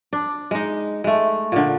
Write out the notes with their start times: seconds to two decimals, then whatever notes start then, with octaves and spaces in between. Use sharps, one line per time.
0.13 D4
0.51 G#3 D#4
1.04 G#3 A3
1.52 A#2 D3